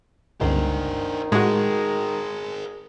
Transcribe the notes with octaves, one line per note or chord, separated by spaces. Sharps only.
G1 C#2 D#3 D4 C5
A2 G#3 F#4 G#4 A#4